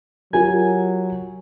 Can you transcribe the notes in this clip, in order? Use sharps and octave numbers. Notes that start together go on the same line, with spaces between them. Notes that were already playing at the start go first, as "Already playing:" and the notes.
F#3 F4 G4 A#4 G#5